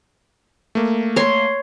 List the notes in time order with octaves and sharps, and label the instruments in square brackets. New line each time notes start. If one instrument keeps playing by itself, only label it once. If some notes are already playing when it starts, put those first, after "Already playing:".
[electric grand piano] A3 A#3
[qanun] C#5 C6